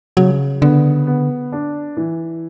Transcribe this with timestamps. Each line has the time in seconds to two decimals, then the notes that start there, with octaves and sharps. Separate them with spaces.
0.17 C#3 F#3
0.61 D3 B3
1.07 B3
1.52 D4
1.97 E3